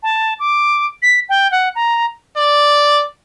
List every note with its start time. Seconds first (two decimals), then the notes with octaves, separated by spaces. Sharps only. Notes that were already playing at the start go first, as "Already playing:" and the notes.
0.03 A5
0.40 D6
1.02 B6
1.29 G5
1.52 F#5
1.75 A#5
2.37 D5